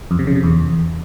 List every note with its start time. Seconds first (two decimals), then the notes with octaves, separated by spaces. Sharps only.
0.11 F2
0.19 C3
0.27 C#3
0.35 C3
0.43 E2